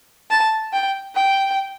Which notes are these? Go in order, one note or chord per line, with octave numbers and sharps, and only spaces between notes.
A5
G5
G5